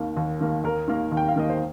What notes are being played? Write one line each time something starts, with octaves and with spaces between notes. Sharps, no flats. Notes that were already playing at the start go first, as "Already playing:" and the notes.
Already playing: D#2 D#3 A#3
D#2
D#3 A#3
D#2 A#4
D#3 A#3
D#2
G5
F5
D#3 A#3 D#5
C5